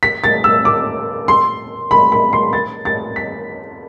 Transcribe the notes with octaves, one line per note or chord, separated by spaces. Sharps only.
B6
A6
E6
D6
C6
B5
B5
C6
A6
A6
B6